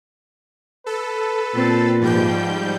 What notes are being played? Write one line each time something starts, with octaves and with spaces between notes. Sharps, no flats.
A4 B4
A#2 C4 A6
G#2 F3 G3 G5 G6